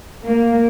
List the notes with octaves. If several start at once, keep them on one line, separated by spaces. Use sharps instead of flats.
A#3